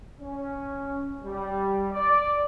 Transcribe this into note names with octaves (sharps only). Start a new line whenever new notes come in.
C#4
G3
D5